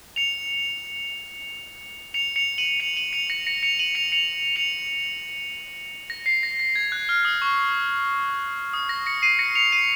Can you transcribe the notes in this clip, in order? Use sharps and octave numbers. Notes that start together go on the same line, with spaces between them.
C#7 F7
C#7 F7
C#7 F7
D#7 F#7
C#7 F7
D#7 F#7
C#7 F7
A#6 C#7
A#6 C#7
C#7 F7
D#7 F#7
C#7 F7
C#7 F7
C#7 F7
A#6
C7
A#6
A#6
G#6
F#6
F6
D#6
C#6
D#6
A#6
A#6 C#7
C7 D#7
A#6 C#7
C#7 F7
C7 D#7